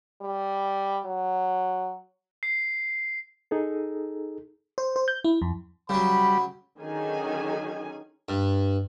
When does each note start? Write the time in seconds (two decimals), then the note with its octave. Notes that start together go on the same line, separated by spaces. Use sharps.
0.22 G3
1.05 F#3
2.43 C7
3.51 D#4 G#4 A4
4.78 C5
4.96 C5
5.08 G6
5.24 E4
5.42 F2
5.89 C#3 F#3 G3 B5
6.79 D3 D#3 F#3 C#4 G#4 G#5
8.29 G2